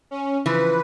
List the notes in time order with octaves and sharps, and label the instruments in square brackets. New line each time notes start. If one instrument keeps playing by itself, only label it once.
[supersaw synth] C#4
[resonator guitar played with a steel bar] C#3 E3 F3 [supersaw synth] B4